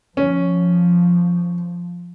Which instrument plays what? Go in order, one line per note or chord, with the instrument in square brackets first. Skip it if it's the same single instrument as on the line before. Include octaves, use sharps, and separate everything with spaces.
[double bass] F3 [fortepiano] C#4